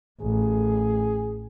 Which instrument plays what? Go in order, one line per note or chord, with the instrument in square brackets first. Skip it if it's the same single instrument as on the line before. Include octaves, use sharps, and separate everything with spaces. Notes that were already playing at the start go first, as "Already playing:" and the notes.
[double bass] A1 [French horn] G#4